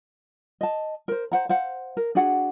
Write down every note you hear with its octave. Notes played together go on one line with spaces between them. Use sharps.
D#5 A5
A#4 C5
C5 F#5 A#5
C5 F5 F#5
A#4
D4 F#4 G#4 F#5